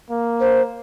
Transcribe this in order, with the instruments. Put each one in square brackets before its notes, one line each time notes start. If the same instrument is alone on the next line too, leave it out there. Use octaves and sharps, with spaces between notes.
[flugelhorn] A#3
[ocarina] C5